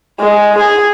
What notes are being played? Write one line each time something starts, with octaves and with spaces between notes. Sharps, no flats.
G#3
G#4